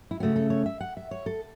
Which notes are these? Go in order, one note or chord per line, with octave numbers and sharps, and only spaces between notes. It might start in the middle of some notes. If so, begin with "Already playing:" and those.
E4
C#3 A3 C#4 F#4
A4
C#5
E5
F#5
E5
C#5
A4